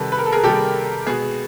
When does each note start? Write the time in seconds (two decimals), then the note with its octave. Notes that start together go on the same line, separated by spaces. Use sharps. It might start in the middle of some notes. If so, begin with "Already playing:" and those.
Already playing: C3 D#3 G3 A4 B4
0.12 B4
0.19 A#4
0.26 A4
0.32 G#4 A#4
0.43 C3 D#3 G3 G4 A4
1.06 B2 G#3 B3 G#4